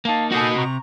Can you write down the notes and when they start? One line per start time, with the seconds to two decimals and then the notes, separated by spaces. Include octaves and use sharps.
0.05 A#3 D#4 F5 A5
0.31 F#4 A4 D#5 G#5 G6
0.55 C3 A#5 C#6